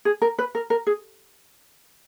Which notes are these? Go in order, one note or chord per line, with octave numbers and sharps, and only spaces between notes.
G#4
A#4
B4
A#4
A#4
G#4